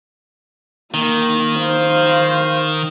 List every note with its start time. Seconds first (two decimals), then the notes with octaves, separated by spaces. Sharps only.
0.94 D#3 A#3
1.57 C5 F5